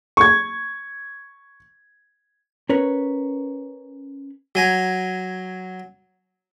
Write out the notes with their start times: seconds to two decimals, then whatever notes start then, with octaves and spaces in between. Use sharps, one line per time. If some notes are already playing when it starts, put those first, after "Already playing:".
0.17 C#6 G#6
2.69 C#4 A#4 B4 C#5
4.55 F#3 G#5 A#5